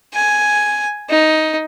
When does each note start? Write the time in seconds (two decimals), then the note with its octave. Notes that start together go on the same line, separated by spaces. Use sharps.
0.14 G#5
1.09 D#4